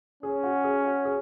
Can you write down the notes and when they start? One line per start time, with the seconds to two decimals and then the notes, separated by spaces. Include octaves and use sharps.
0.23 C#4 G#4
0.43 F#4
0.64 G#4
0.84 F#4
1.05 G#4